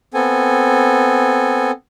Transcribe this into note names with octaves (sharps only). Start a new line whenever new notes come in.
B3 C4 A4 G#5